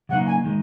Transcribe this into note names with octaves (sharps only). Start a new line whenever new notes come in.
C#3 F#3 A#3 D#4 F#5
G#5
D#3 G#3